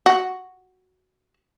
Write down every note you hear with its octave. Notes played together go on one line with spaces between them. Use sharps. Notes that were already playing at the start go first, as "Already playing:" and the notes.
F#4